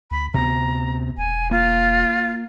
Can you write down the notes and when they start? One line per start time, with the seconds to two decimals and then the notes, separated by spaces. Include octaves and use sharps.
0.11 D2 B5
0.34 D2 C3 B3 A#5
1.17 E1 G#5
1.51 A#3 F4